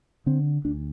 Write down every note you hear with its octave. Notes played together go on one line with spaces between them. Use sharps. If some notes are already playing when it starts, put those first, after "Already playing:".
D3 C4
D2 D4